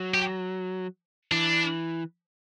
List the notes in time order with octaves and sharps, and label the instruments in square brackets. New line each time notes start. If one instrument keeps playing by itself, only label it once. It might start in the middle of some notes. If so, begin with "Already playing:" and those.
Already playing: [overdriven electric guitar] F#3
[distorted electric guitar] G4
[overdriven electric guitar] E3 [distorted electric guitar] D4